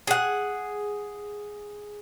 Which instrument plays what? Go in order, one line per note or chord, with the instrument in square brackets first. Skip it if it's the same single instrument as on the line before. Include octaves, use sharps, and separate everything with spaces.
[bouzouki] G#4 F#5